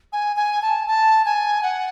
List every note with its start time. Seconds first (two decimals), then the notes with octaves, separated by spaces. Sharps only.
0.13 G#5
0.37 G#5
0.62 A5
0.88 A5
1.25 G#5
1.63 F#5